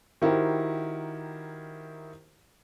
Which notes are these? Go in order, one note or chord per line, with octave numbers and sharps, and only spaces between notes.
D#3 E4 F#4 G4 A#4 C5